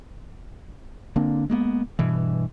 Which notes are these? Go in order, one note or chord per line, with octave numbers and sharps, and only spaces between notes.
D3 A#3 C4 D4
G#3 A#3 B3
G2 B2 E3